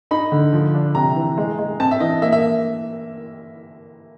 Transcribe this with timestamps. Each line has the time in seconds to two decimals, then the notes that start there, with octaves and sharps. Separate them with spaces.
0.11 D#4 B5
0.32 D3
0.53 F3
0.74 D4
0.95 C3 A#5
1.16 E3
1.38 G#3
1.59 G#3
1.80 C4 A5
1.91 E5
2.00 E3 D#5
2.22 A#3 E5
2.32 E5